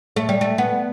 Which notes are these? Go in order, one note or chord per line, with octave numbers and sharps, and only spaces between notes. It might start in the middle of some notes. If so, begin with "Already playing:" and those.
A3
G3
A3
B3